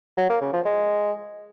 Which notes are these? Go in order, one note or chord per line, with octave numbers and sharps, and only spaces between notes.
F#3
A#3
C#3
F3
G#3